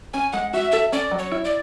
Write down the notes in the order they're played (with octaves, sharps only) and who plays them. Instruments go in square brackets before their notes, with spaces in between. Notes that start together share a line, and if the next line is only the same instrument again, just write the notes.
[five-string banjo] C#4 [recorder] G#5
[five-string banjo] G#3 [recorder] F#5
[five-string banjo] F#4 [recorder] E5
[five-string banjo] A4 [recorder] E5
[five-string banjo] C#4 [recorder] D5
[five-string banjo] F#3
[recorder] C#5
[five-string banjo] E4
[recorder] D5